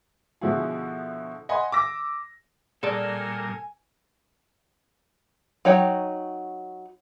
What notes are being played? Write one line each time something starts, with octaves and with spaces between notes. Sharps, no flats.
B2 D3 F3 E4 F#4 G#4
D#5 F#5 G#5 B5 C6
D6 E6 A#6
A#2 G3 A#3 G#4 A4 D5 G#5
F#3 D#4 C#5 G5